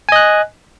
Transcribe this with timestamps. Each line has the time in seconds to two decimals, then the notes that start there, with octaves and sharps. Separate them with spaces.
0.09 G#5
0.12 D#5
0.16 F#6